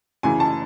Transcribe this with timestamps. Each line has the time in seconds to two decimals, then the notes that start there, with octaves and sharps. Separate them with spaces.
0.23 F#2 C#3 E3 G#5
0.40 A5